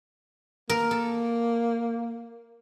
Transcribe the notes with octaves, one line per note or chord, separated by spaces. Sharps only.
A#3 A#4
A4